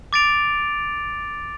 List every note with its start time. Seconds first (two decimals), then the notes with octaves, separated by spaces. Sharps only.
0.13 D6 A6 D7 F7